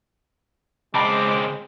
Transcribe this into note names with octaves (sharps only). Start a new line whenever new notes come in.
C#2 G#3 C4 A5 B5 D6